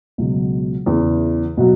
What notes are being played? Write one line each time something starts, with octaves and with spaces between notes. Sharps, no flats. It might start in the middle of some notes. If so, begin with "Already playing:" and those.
C#2 B2 F#3
E2 C#3 E3
B2 F#3